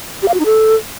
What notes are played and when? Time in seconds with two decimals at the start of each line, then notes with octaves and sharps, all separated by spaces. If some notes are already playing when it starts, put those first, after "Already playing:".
0.22 G4
0.28 F5
0.34 F#4
0.40 D#4
0.46 A4